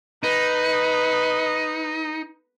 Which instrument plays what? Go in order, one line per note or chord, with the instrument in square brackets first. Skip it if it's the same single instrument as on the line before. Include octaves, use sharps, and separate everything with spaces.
[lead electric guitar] D#4 [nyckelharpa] B4